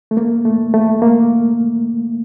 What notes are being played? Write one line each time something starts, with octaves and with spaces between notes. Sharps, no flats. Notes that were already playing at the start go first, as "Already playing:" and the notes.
A3
A#3
A3
A3
A#3